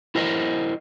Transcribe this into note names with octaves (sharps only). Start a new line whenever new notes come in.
E4 A#4 C5 D#5